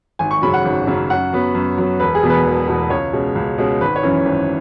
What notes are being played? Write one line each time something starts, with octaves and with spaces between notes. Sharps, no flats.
G#1 G#5
C#6
F#2 C#3 F#3 B5
F#5
G#1
F#2 C#3 F#3
F#2 F#5
F#3 B3
F#2
F#3 B3
E1 B4
G#4
E2 B2 B3
B4
E1
E2 B2 B3
C#2 C#5
B2 G#3 C#4
C#2
B2 G#3 C#4
G#1 B4
C#5
F#2 E3 C#4
G#1